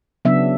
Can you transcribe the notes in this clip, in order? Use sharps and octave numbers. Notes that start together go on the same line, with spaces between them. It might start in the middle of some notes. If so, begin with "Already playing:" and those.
C#3 F#3 B3 D4 E5